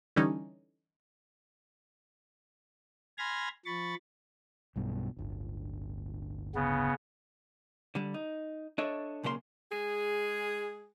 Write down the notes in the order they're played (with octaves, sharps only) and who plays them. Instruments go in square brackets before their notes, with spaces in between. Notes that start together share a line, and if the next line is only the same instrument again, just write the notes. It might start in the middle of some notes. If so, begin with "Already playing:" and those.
[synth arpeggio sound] D3 E3 G3 C#4 D#4
[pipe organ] G#5 B5 C6 F6 G#6 A#6
F3 B5 C#6 A6
[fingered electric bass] B1 G2 B2
D1 G1
[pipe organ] C#3 B3
[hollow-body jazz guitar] D3 G3
D#4
D4 A4 C#5 D#5 E5
B1 C#3 A#3 C5 C6
[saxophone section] G#3 G#4